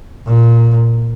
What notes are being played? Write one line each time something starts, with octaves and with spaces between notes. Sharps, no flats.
A#2